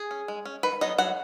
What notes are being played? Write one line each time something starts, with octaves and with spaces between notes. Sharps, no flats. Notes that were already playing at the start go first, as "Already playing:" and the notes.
Already playing: G#4
C#4
G#3
C#4
D#3 B4
F#3 B3 D#4 D#5
F#3 F#5